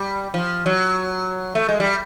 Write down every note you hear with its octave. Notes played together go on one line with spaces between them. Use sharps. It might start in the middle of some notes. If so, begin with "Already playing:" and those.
Already playing: G3
F3
F#3
A3
G#3
G3